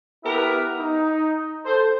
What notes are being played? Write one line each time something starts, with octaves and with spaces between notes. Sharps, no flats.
B3 E4 G4 A#4 B4 E5
D#4
A4 C5